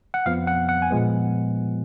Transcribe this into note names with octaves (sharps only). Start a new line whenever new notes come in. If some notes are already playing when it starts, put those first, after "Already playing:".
F#5
F2 F3 B3 F5
F#5
F#5
G#5
A#2 F3 G#3 B3